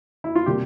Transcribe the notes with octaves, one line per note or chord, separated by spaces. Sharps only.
E4
F4
C3 G3 A#3 G4